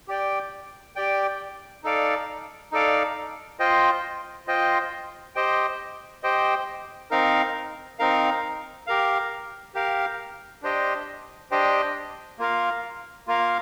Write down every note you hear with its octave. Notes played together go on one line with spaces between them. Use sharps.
G4 D5 G5
G4 D5 G5
D#4 A4 D5 F5
D#4 A4 D5 F5
F4 C5 D#5 G5
F4 C5 D#5 G5
G4 C5 D#5 G5
G4 C5 D#5 G5
C4 D#4 A#4 F5
C4 D#4 A#4 F5
G4 A#4 F5
G4 A#4 F5
D4 G4 C5 D#5 G5
D4 G4 C5 D#5 G5
A#3 F4 A#4 F5
A#3 F4 A#4 F5